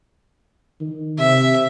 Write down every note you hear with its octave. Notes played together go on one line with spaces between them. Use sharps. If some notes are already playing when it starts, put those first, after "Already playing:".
D#3
C3 E5